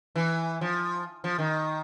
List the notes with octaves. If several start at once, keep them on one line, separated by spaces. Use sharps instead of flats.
E3
F3
F3
D#3